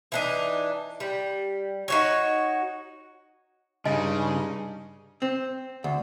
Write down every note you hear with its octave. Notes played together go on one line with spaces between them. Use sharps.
E3 D4 D#4
G3
D#4 F#4 C#5
G2 C#3 G#3 D4 D#4 D#5 G#5
C4
D2